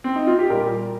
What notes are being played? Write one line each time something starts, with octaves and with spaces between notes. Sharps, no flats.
C4
D#4
F4
G4
A#2 G3 A#3 A#4